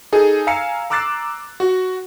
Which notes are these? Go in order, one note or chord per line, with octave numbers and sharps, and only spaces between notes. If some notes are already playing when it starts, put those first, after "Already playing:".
D#4 G#4 A4
F5 G#5 A#5 E6 C7 C#7
A#5 D6 E6 F#6 A6 C7
F#4